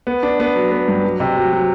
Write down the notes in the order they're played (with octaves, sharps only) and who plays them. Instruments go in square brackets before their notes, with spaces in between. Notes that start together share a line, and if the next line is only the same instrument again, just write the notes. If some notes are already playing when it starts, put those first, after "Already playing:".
[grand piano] B3
D4
B3
F#3
B3
G2
F#3
C3
F#3
F#3